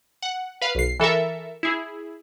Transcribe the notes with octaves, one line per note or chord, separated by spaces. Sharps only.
F#5
B4 F5
B1 C7
E3 A4 A#4 E5
E4 G#4